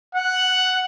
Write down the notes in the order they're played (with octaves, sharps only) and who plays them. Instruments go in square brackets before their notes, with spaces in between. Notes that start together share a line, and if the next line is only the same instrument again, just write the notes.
[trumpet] F#5